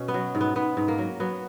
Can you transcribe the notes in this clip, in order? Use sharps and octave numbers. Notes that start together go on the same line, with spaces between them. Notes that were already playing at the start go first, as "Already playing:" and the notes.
Already playing: B2 C#4
B3
F#3
G#2
B3
G#2 B3
G#2
A#3
F#3
F#3 B3